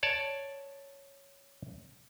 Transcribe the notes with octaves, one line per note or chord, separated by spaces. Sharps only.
C#5 D5 A5